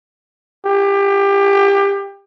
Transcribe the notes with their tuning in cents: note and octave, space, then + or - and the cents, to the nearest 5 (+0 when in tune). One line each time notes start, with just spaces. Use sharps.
G4 +25